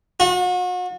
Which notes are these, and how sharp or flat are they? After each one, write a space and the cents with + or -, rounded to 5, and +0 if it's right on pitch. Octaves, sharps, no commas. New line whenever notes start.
F#4 -40